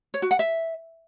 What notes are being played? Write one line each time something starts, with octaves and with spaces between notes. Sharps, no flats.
C#5
F#4
F#5
E5